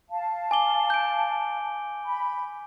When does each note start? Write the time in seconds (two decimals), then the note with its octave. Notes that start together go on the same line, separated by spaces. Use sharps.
0.09 F5 A5
0.51 G#5 D6 G7
0.90 G6 D7
2.04 B5